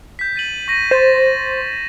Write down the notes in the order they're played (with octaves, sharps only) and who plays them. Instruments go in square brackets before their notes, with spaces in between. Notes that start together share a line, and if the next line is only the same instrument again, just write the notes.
[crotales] G6 B6
A6 D#7 F#7
C#6 A#6 D#7
[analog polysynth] C5 [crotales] A6 B6 E7